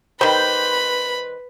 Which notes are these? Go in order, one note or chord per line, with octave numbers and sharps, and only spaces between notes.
D#3 G3 B4 C5 B5